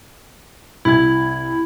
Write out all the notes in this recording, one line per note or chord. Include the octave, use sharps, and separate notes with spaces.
C2 E4 G#6